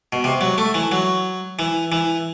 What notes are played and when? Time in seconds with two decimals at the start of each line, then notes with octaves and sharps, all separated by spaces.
0.13 B2
0.24 C3
0.41 F#3
0.58 A3
0.74 E3
0.92 F#3
1.59 E3
1.92 E3